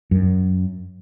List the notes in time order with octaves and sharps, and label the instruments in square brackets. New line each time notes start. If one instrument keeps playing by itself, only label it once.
[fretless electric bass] F#2